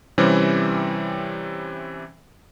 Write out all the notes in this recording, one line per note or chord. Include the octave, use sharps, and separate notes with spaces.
C3 E3 G3 C4 C#4